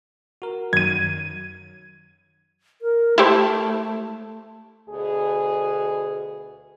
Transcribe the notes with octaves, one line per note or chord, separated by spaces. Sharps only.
F#4 A#4
F#2 D#3 F#3 G#6 D#7
A#4
A3 E4 G4 C5
D2 B2 G#4